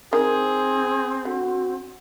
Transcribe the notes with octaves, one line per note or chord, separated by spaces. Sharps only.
D#3 C4 G#4
D3 F#4